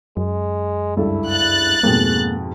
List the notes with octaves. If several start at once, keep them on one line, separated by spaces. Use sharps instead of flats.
F#2 G#3
C#2 G2 E4 A4
F#6 A6
F2 G#2 B2 A#3 G#4